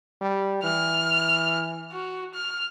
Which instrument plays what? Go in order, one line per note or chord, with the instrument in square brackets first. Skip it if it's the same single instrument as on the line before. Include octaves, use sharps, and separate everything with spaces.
[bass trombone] G3
[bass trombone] E3 [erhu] F6
[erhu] F#4
F6